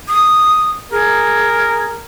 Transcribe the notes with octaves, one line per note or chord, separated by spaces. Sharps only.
D#6
G#4 A#4